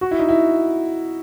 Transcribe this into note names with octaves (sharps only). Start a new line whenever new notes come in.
F#4
E4
D#4
E4